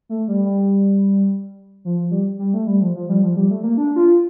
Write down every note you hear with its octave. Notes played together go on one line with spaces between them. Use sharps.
A3
G3
G3
F3
G3
G3
A3
G3
F3
F3
G3
F3
G3
A3
A#3
D4
F4